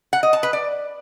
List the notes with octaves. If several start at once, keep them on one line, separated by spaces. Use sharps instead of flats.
F#5
D#5
A5
B4
D5